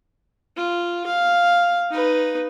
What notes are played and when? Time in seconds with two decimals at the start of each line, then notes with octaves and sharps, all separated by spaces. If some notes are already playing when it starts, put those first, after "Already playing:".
0.57 F4
1.06 F5
1.91 D#4 B4